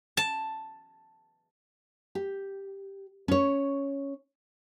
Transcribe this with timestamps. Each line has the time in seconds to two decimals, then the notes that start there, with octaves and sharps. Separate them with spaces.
0.17 A5
2.15 G4
3.28 C#4 C#5